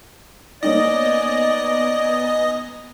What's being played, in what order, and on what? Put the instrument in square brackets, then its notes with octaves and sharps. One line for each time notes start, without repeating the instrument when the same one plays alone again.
[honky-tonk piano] A#3 C#4 D#4 [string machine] B3 G#5 A#5 [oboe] D5 [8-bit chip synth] D#5